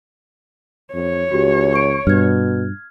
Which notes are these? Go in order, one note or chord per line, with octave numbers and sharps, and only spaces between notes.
F2 C#5
C#2 F#4 G4
C#6 D7
G2 B2 F6 G#6